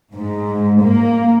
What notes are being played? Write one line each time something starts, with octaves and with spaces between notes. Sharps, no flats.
G#2
A#3